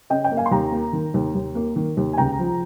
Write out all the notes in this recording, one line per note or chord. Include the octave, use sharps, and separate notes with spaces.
C#3 D#5 G5
D#5 G5
A#3
F5 G#5
C6
D#2 G5 A#5
A#3
D#3
D#2
D#2
A#3
D#3
D#2
G#5
C#2 G5 A#5
F3